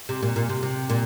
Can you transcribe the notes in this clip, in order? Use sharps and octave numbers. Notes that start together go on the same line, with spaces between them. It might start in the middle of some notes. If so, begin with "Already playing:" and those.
C3
A#2
A#2
C3
C3
A#2